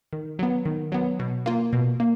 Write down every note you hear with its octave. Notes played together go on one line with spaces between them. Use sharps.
D#3
F#3 B3
D#3
F#3 B3
B2
A#3 F4
B2
A#3